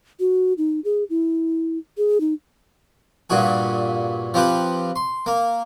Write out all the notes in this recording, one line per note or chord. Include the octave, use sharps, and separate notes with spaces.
F#4
D#4
G#4
E4
G#4
D#4
G2 A#2 F#4 G#4
F3 C4 G4 B4
C6
A#3